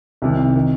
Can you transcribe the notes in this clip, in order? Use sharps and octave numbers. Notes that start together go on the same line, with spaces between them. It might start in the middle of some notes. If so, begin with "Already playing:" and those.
C2 C3 D#3
D#3